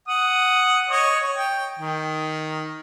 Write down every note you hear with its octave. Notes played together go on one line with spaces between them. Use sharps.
F#5 D#6
C#5 D#5
G5
D#3